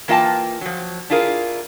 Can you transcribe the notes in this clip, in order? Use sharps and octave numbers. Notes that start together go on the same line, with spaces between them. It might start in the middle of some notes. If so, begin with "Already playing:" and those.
E3 A#3 F4 E5 G5 A5
F3 F#3
D4 E4 F4 G#4 A#4